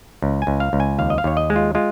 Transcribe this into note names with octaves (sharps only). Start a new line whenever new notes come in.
C#2
G#5
C#2
F5
C#2
G#5
D#2 F5
D#5
F5
D#2 C#5
D#5
G#3
F4
G#3 F4